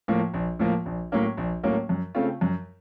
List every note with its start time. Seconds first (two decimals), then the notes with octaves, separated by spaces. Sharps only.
0.08 A2 F3 A#3
0.34 A#1
0.59 A2 F3 A#3
0.86 A#1
1.12 A2 F#3 A#3 C#4
1.37 A#1
1.63 A2 F#3 A#3 C#4
1.89 F#2
2.15 C#3 A3 C4 F4
2.41 F#2